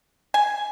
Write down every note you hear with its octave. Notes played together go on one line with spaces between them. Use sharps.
G#5